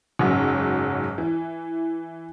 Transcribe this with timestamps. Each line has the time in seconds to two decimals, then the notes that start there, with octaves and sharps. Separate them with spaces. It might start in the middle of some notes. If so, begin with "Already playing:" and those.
0.19 F#1 G#2 F#3
1.18 E3